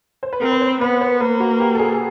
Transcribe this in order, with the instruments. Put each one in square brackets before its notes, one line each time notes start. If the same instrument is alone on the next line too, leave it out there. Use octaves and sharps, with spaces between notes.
[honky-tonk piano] C5
B4
[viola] C4 [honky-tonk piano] A#4
[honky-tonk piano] B4
C5
[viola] B3 [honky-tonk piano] B4
[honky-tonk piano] C5
[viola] A#3 [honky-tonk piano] B4
[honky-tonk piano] F#4
G4
A4
G#4